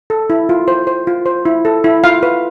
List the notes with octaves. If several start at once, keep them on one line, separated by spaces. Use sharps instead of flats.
A4
E4
F4
C5
C5
F4
C5
E4
A4
E4
F4 F5
B4